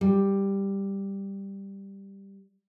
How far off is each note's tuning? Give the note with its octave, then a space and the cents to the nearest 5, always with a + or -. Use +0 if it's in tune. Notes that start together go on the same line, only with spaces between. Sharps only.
G3 +5